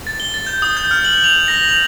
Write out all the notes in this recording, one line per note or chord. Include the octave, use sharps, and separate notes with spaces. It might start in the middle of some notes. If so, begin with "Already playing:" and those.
A6
G7
A6
G6
D#6
G6
F6
F#7
F7
A#6
F7